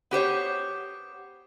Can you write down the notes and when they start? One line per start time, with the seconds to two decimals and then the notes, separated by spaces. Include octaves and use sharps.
0.11 B3 G4 C5 C#5